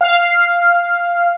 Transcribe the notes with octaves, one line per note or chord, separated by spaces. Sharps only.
F5